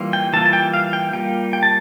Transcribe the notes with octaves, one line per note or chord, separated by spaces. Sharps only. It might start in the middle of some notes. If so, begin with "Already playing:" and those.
Already playing: E3 G3 A#3 F4
G5
E3 G3 A#3 F4 A5
A5
G5
F5
G5
G3 A#3 F4 G5
G5
A5